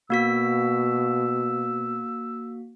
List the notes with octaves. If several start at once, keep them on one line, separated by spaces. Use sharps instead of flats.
B2 A#3 F#4 E6 B6